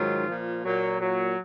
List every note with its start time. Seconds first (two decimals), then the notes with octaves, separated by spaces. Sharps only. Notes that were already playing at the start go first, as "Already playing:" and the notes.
Already playing: G#2 D#3 F#3 F4
0.26 A#2 F3
0.64 A#2 F#3
1.00 A#2 F#3